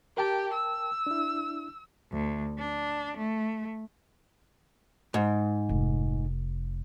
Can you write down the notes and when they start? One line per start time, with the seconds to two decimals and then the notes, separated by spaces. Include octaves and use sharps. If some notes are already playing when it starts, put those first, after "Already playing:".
0.17 G4 A#4 G5 A5
0.54 E6
1.07 D4 E4
2.12 D2
2.58 D4
3.17 A3
5.14 G#2
5.69 F1